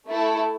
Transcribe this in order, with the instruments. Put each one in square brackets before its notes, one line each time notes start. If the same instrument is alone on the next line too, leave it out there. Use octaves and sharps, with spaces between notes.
[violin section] A3 E4 A4